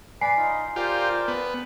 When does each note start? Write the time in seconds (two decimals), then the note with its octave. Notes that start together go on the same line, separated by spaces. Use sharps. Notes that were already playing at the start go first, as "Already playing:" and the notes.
0.21 B4 D5 G#5 B5 C7
0.37 D#4 F4
0.76 F4 G4 A#4 C5 D5
1.28 B3